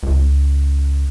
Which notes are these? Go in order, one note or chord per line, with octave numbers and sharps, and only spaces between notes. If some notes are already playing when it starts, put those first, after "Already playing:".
C#2